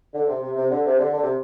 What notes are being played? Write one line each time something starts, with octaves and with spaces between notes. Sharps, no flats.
D3
C3
C3
C3
D3
C3
D3
D3
C3